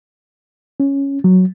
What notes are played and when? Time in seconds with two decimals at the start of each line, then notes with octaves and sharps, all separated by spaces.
0.80 C#4
1.24 F#3